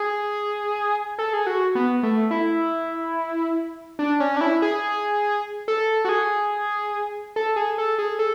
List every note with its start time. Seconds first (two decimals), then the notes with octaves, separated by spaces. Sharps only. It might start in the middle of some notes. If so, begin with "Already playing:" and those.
Already playing: G#4
1.19 A4
1.33 G#4
1.47 F#4
1.75 B3
2.03 A3
2.31 E4
3.99 D4
4.20 C#4
4.37 D4
4.41 E4
4.62 G#4
5.68 A4
6.05 F#4
6.09 G#4
7.36 A4
7.56 G#4
7.78 A4
7.99 G#4
8.19 A4